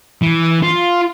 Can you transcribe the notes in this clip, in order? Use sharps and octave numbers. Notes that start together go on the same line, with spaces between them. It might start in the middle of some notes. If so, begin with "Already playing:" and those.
E3
F4